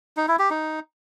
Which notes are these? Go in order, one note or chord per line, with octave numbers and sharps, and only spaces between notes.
D#4
E4
G4
D#4